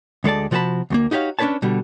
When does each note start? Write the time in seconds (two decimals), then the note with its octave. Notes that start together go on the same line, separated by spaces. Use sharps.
0.24 D2 G#3 A4 D5 A5
0.51 C3 F3 F#4 A#4 A5 B5
0.90 D2 A3 A#3
1.11 D#4 F#4 G4 C#5 F5
1.39 C#4 D4 G#4 B4 C#5 A5
1.62 B2 D3 G3